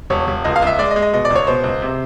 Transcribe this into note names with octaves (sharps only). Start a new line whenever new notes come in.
E1 C#5
E1
C#2 D#5
F5
C#2 E5
G#3 D5
D#5
G#3
D#5
B2 D#5
D5
C#2 C#5
B2 C5
C#2
C3